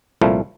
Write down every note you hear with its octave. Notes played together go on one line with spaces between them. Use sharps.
C2 A#2 F3 A3